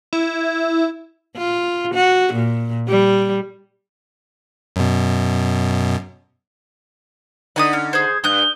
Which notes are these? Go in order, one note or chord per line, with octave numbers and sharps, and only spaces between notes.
E4
F4
F#4
A#2
G3
F#2 B2
D3 D#4 F#5 G#5 D#6
C#4
G#4 C5 G#6
G2 D#6 F#6 G6 G7